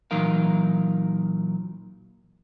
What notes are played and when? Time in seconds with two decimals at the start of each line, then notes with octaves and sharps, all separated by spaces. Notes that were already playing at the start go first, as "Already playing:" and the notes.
0.11 A#2 E3 F#3 D#4 A#4 F5